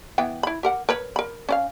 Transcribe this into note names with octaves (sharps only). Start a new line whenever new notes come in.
E3 B3 G5
E4 B5
G4 A#4 F#5
A#4 B4 C#5
A#4 B5
C#4 D5 F5